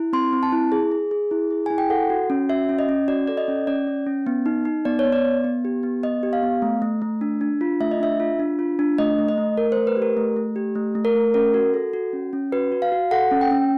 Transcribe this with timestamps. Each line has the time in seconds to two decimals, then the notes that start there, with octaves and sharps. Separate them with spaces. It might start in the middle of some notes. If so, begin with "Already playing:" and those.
Already playing: E4
0.13 C4 C6
0.33 C4
0.43 A5
0.52 E4
0.72 G#4
0.92 G#4
1.11 G#4
1.31 E4
1.51 G#4
1.66 E4 G#5
1.78 G5
1.90 A4 F#5
2.10 F#4
2.30 C#4
2.49 F#4 E5
2.69 C#4
2.79 D#5
2.89 C#4
3.08 F#4 D5
3.28 A4 D5
3.37 D#5
3.48 C#4
3.67 C#4 D5
3.87 C#4
4.06 C#4
4.27 B3
4.46 D#4
4.65 D#4
4.85 B3 D5
4.99 C#5
5.05 B3
5.12 D5
5.25 B3
5.44 B3
5.65 G4
5.83 B3
6.03 B3 D#5
6.23 G4
6.33 F5
6.43 B3
6.62 A3
6.82 A3
7.02 A3
7.21 D4
7.41 D4
7.61 F4
7.81 A3 E5
7.91 D#5
8.00 D4 E5
8.20 F4
8.39 D4
8.59 F4
8.79 D4
8.98 A3 D#5
9.18 A3
9.28 D#5
9.38 A3
9.58 A3 A#4
9.72 C5
9.77 A3
9.87 B4
9.97 G4
10.02 A#4
10.17 A3
10.36 A3
10.56 G4
10.75 A3
10.95 A3
11.05 A#4
11.15 A3
11.34 C#4 A#4
11.54 F#4
11.74 A4
11.93 F#4
12.13 C#4
12.33 C#4
12.52 F#4 B4
12.72 F#4
12.82 F5
12.92 F#4
13.11 A4 F#5
13.31 C#4
13.41 G5
13.51 C#4